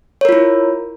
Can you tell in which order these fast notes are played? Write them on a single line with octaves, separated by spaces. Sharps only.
C#5 A#4 F4 E4